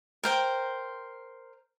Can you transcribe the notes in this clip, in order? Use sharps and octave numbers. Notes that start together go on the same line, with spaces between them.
A#4 C5 G5